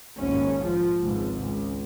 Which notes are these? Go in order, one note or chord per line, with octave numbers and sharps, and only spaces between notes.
A#1 D#2 G#2 C#4
F3
G#1 C#2 G#2
C#2